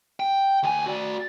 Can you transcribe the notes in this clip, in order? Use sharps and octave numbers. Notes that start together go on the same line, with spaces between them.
G5
D2 G#5
F#4 D5